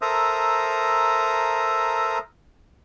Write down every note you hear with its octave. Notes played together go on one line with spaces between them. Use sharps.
A4 A#4 C5 E5 A#5 D#6